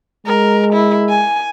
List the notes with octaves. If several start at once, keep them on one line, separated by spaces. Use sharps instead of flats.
G#3 A#4
E4
G#5